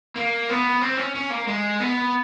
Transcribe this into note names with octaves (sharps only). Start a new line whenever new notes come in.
A#3
B3
C4
C#4
C#4
A#3
G#3
B3